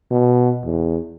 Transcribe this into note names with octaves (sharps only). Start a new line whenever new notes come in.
B2
E2